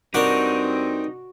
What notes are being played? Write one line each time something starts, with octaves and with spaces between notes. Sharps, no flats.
G2 C4 D4 D#4 F#4 A#4 D6